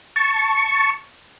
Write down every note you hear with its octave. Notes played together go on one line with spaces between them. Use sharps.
A5 C#6